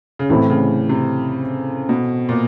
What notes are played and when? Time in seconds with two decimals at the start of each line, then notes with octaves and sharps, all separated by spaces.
0.19 C#3
0.29 A2 C3 E3 A3 C4 E4
0.50 C#3
0.89 C3
1.89 B2
2.29 A#2